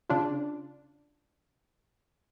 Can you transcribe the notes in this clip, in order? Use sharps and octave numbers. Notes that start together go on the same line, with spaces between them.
C#3 D4 F4